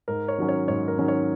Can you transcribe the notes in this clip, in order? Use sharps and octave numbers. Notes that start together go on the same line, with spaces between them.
G#2 A#4
C#5
D#3 F#3 C#4
C#5
G#2 C#5
A#4
D#3 F#3 C#4
C#5